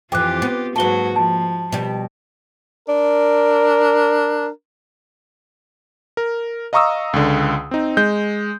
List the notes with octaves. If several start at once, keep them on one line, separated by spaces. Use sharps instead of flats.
F2 E3 F4 G4 G5 D6 F#6
B3
G#2 F#3 A#3 F#4 B4 A5 G7
F3 A5
B2 G3
D4 A#4
A#4
D#5 F5 A#5 C#6 D#6 E6
C#2 D3
C4 D#4
G#3 G6